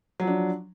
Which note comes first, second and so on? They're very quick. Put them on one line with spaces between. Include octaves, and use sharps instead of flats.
F#3 F3 D4